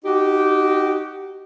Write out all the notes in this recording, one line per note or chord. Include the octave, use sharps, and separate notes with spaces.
D#4 F#4 G4